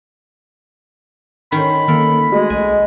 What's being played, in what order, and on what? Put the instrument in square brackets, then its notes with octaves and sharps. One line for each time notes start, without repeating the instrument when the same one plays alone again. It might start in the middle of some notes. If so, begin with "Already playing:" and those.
[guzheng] D#3 C#4 C5 [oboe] B5
[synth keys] D#3 A#3 [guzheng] A4 A#4
[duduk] G#3 [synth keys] A3 F#4 G#4
[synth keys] B1 [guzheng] G#5